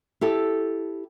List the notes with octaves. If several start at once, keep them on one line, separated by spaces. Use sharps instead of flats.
E4 G4 A4